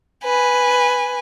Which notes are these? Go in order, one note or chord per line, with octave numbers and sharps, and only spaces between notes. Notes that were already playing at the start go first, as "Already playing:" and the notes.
B4 G#5